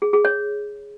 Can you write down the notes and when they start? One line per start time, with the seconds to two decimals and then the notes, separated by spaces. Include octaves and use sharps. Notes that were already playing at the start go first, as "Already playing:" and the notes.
0.02 G#4
0.13 G#4
0.25 C#5